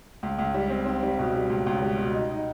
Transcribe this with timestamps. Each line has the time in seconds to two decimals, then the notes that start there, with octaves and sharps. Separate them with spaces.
0.23 C#2
0.38 C#2
0.55 G3
0.70 C4
0.86 C4
1.03 G3
1.19 B2
1.34 G3
1.50 C#2
1.66 C#2
1.82 G3
1.98 B2
2.14 D#4
2.31 D#4